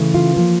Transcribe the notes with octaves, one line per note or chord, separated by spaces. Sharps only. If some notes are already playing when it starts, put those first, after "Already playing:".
Already playing: C#3 E3 A3
F4
F3 A#3